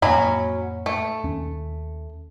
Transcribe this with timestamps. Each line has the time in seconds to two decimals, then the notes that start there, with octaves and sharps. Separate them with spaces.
0.02 F2 A2 F#3 A#3 C#4 B5
0.86 A3
1.24 D#2 C#4